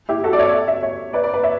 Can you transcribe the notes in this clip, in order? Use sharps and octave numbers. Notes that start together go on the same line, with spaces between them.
E4 G4
F#4 A4
D5
C#5 E5
E5
E5
C#5 E5
B4 D5
B4 D5
B4 D5
C#5 E5